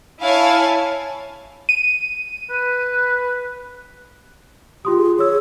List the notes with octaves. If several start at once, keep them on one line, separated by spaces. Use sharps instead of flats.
E4 C#5 F5 G#5 A5
D#7
B4
F4 G4 C6 D#6
G#4
G#4 C#5 E6